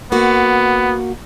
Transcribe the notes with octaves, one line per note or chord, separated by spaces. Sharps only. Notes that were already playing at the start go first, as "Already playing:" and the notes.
A#3 B3 F#4